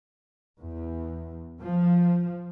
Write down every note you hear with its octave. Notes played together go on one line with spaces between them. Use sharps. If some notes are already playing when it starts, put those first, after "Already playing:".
E2
F3